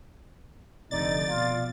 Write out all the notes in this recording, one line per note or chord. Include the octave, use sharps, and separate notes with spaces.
F1 D3 D#4 D5 A6
B2 F4